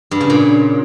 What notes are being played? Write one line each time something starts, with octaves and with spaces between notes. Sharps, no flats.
G2
C#3
A#2